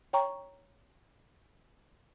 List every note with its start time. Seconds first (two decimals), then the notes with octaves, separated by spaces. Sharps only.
0.13 C#5 G5 A#5 C#6